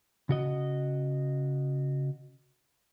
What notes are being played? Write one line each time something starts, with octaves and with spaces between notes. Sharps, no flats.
C#3 F#4 D#5